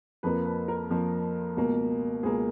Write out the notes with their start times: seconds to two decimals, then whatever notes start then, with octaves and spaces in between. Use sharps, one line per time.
0.23 F2 F3 A#3 B4
0.45 B4
0.68 A#4
0.90 F2 F3 A#3
1.57 C#2 B2 A#3
2.23 C#2 B2 A#3 G#4